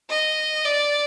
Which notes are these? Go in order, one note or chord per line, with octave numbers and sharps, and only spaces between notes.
D#5
D5